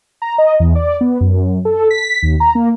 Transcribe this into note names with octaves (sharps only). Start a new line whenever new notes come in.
A#5
D#5
E2
D5
B3
F#2
A4
B6
D#2
A#5
A#3